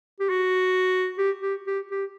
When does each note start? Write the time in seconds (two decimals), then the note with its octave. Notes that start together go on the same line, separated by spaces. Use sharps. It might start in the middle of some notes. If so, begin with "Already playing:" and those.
0.20 G4
0.30 F#4
1.18 G4
1.42 G4
1.67 G4
1.91 G4